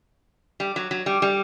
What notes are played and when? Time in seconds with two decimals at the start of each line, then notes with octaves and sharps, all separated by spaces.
0.60 G3
0.76 F#3
0.91 F#3
1.06 G3
1.22 G3